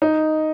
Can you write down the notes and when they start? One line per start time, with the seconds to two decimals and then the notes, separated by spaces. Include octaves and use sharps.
0.02 D#4